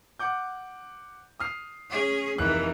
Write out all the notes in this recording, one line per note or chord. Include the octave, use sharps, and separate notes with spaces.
F#5 D6 G6
D#6 F6 C7
C#4 G#4
F1 E3 A#3 D#4 F#6